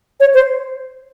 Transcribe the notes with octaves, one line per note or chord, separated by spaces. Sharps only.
C#5
C5